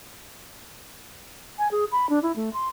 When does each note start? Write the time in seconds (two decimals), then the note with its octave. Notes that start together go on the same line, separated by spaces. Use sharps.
1.58 G#5
1.71 G#4
1.92 B5
2.09 D4
2.22 E4
2.36 A3
2.53 C6